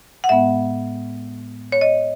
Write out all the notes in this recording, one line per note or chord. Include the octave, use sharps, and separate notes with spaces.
F#5
A2 G#3 B3 E5
C#5
D#5